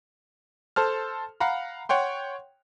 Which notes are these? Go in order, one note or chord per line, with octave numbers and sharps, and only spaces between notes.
A4 C5 A5 F6
F5 F#5 A#5 B5
C#5 F#5 G5 C6